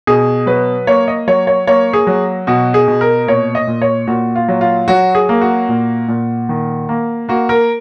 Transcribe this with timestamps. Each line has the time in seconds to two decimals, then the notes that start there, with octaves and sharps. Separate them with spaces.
0.07 B2 G#4
0.46 F#3 B4
0.87 A#3 C#5
1.08 D#5
1.27 F#3 C#5
1.47 C#5
1.67 A#3 C#5
1.93 G#4
2.07 F#3
2.47 B2 F#4
2.74 G#4
2.88 B2
3.01 A#4
3.27 A#2 C#5
3.55 D#5
3.67 A#2
3.82 C#5
4.07 A#2 F#4
4.35 F4
4.48 F#3
4.61 F4
4.88 F#3 F#4
5.15 G#4
5.29 A#3
5.41 F#4
5.69 A#2
6.08 A#2
6.49 D#3
6.89 A#3
7.28 A#3 F#4
7.49 A#4